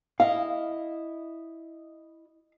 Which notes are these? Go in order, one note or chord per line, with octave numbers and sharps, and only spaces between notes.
E4 D#5 F5